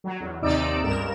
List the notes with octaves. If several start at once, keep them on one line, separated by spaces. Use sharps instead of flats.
F#3
E2
D#2 C3 D#4 D5 E6 D7
C#2 G2 A#4 E7